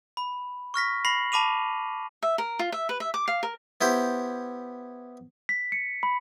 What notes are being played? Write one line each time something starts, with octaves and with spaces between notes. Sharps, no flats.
B5
C#6 F6 A#6 B6
B5 A#6 C7 F#7
A5 B5 D6 D#7 F7
E5
A#4
F4
E5
B4
E5
D6
F5
A#4
B3 E4 G4 C5
B6
C#7
B5